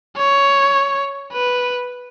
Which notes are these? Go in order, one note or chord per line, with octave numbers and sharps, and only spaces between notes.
C#5
B4